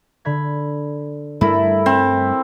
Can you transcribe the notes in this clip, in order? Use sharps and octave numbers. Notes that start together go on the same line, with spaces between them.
D3 B5 G#6
G2 G3 A3 E4 A4 A#4 E5
C4